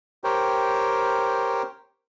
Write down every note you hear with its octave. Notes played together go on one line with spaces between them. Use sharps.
G4 A#4 C5 C#5 G5